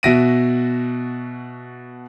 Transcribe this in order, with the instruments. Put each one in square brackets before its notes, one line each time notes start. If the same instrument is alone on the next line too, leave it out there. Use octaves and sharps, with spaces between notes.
[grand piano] B2 F#4 E5 A#6 D7 D#7